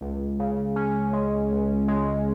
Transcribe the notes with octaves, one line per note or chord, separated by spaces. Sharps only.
C#2
C#3
C#4
G#3
C#2
G#3